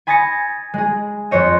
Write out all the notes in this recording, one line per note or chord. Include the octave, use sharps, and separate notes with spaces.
G#5 B5 D#6 A6 A#6 C#7
G#3 G#4
F2 C5 C#5 D#5